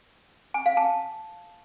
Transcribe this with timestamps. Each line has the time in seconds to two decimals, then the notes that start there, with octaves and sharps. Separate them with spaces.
0.54 G#5
0.66 F5
0.77 A5